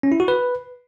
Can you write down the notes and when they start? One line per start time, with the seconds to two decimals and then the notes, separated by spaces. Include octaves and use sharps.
0.03 C#4
0.12 E4
0.20 F#4
0.28 B4